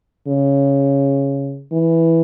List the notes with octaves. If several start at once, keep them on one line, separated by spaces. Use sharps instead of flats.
C#3
E3